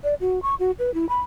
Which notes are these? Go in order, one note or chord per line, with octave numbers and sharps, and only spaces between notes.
D5
F#4
C#6
F#4
B4
E4
B5